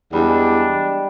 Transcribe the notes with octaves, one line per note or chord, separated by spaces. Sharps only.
E2 G3 G#3 D4